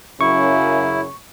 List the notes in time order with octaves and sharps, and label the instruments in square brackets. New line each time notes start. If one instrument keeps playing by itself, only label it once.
[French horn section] F#2 C#3 [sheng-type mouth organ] E4 [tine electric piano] C#6